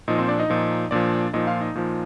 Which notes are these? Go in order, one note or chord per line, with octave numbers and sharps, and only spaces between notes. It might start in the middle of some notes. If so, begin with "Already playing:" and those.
A#2 F3 D#4 D#5
C4 C5
D4 D5
D#4 D#5
A#2 F3
A#2 F3 D4 D5
A#2 F3 D#4 D#5
F4 F5
D#4 D#5
A#2 F3